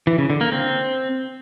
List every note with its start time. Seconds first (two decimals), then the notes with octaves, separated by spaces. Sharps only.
0.07 E3
0.18 C#3
0.30 D3
0.41 A#3
0.52 C4